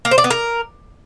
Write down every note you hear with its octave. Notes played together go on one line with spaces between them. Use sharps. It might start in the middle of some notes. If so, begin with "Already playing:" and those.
A#3
C5
D5
B3
A#4